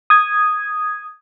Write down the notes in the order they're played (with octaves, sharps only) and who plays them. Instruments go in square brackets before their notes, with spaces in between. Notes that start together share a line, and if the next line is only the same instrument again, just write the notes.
[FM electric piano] D#6 G#6